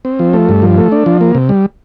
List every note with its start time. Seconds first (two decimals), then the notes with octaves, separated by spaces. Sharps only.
0.05 C4
0.19 F3
0.33 A3
0.49 G2
0.62 F3
0.78 A3
0.92 D4
1.06 F3
1.21 A#3
1.35 C3
1.49 G3